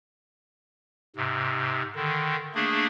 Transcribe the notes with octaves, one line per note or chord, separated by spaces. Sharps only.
G#2 C3
D3 D#3
A3 A#3 D4 G#4